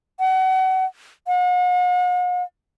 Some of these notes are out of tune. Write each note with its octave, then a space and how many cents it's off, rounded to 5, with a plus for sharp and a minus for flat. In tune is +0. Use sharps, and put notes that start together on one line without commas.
F#5 +30
F#5 -45